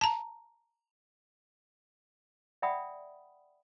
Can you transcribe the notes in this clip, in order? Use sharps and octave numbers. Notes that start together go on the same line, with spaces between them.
A5 A#5
D5 E5 F#5 G5 B5 D#6